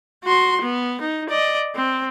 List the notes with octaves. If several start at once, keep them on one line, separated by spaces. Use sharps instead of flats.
F#4 C6
B3
D#4
D5 D#5
C4